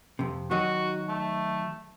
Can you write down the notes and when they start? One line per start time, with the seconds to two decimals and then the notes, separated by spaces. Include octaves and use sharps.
0.19 F2 C3
0.51 D#3 F#3 D#4 F#4
1.09 A3